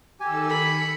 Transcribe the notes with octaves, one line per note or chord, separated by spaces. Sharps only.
D#3 G4 A4 G#5 E6
B5 C#7